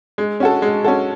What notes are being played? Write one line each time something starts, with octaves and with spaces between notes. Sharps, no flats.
G#3
C#4 F#4 A4
G#3
C#4 F#4 A4